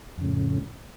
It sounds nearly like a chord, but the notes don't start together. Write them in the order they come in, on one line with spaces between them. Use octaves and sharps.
F2 C#3 A2